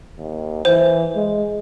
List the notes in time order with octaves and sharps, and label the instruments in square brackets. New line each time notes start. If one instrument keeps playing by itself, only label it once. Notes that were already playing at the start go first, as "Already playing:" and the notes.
[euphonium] D#2
[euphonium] E3 [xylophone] C5
[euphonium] G#3